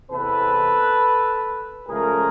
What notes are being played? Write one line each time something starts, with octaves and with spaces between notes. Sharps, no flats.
E2 C3 E3 A4 B4
C#2 C#3 F3 A3 G#4 A#4